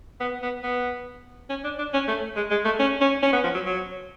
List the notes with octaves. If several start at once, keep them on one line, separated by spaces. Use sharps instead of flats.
B3
B3
B3
C#4
D4
D4
C#4
A3
G#3
G#3
A3
C#4
C#4
C#4
B3
F3
F#3
F#3